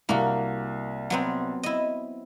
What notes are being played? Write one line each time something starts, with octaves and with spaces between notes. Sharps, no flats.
C2 A#3 F#4
F#3 B3 C4
E4 D#5